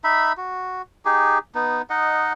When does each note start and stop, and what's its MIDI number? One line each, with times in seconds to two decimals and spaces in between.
0.04 0.32 63
0.04 0.32 76
0.04 0.32 83
0.37 0.82 66
1.05 1.38 63
1.05 1.38 67
1.05 1.38 68
1.55 1.82 59
1.55 1.82 63
1.90 2.33 63
1.90 2.33 75
1.90 2.33 78